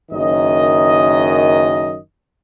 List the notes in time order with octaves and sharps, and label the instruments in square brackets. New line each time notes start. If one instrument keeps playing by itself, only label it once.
[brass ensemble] F#1 F#2 D#3 D#5